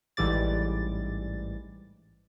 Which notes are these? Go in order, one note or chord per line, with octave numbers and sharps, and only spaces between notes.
A1 G#2 E3 G3 D5 A6